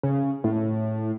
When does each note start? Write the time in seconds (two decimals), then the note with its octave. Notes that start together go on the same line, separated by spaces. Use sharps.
0.03 C#3
0.44 A2